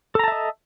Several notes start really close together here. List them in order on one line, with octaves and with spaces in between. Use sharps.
A4 A#5 A5 E5 D#5